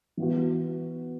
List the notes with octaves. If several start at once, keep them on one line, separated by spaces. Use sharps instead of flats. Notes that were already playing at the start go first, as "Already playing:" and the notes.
E3 B3 F#4